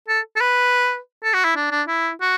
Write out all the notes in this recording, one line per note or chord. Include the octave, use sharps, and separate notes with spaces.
A4
A4
B4
A4
F#4
E4
D4
D4
E4
F#4